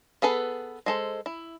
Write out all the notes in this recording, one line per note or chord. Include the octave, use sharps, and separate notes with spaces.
B3 G#4 A4 B4
G#3 A4 C5
E4